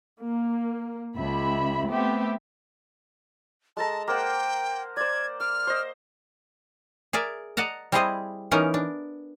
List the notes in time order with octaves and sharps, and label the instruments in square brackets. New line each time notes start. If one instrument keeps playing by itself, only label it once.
[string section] A#3
C#2 E5 B5
A3 B3 C4 G4 E5
[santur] G#3 A4 A#5 [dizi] A5
[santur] A#3 C5 F#5 [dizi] G5
[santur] C5 D5 [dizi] G#6
[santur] D6 [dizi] F6
[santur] C5 D#5
[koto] G#4 A#4 D5 E5
D5 D#5 F#5 A5 A#5
G3 C4 E4 G#4 C5 D#5
E3 B3 C#4 D#4 A#4
D4